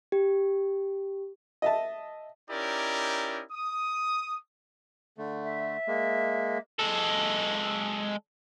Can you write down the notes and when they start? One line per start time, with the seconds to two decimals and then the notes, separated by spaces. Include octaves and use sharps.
0.12 G4
1.62 D#5 E5 A5
2.50 C#4 D#4 E4 G4 A#4 D5
3.52 D#6
5.18 D3 A3
5.44 E5
5.87 G#3 A#3
6.79 G#3 A4